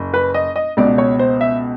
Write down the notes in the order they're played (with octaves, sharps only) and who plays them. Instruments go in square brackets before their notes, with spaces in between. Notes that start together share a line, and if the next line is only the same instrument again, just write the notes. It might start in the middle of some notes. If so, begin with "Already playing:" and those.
Already playing: [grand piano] F#1
B4
D#5
D#5
C#2 B2 D5
C#5
C5
E5